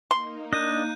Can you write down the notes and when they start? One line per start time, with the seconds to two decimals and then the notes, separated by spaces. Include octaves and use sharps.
0.11 A#3 D#4 C6
0.53 D4 D#5 F#6 G6 D#7